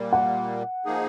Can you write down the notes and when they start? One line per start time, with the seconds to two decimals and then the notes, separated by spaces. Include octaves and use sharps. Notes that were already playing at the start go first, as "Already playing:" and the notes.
Already playing: A#2 G3 A#3
0.13 F#5
0.85 F3 A#3 D#4 G#4